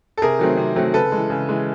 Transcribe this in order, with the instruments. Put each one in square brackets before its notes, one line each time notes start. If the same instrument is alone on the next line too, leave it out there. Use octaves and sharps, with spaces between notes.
[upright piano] A4
C3 G#4 A#4
D#3 F#3 A3 C4
C3
D#3 F#3 A3 C4
C#3 A4 B4
E3 G#3
C#3
E3 G#3